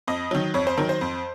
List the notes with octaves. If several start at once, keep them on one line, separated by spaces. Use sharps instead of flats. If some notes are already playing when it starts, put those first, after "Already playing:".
F2 D#5
D#3 F#3
F2 C#5
C5
D#3 F#3 A#4
C5
F2